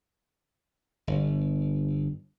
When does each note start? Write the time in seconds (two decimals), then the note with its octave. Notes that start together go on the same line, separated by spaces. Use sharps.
1.07 G1